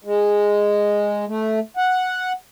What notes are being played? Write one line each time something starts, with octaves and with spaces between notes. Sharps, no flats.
G#3
A3
F#5